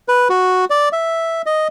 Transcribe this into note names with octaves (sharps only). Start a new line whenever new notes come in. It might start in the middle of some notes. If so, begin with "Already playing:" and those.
B4
F#4
D5
E5
D#5